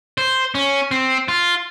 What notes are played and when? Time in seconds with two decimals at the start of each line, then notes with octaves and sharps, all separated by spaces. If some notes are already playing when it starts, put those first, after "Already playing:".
0.18 C5
0.55 C#4
0.91 C4
1.28 F4